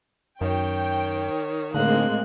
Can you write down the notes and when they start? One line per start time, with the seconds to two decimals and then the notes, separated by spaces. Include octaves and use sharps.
0.41 F#2 D#3 C#5 G5
1.74 A2 D3 G#3 A#3 C4 F#6